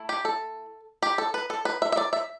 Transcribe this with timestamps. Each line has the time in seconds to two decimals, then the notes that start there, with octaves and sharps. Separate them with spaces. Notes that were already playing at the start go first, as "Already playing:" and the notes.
Already playing: A3 E4
0.09 G4
0.25 A4
1.02 G4
1.18 A4
1.34 B4
1.50 A4
1.65 B4
1.82 E5
1.92 E5
1.97 D5
2.13 E5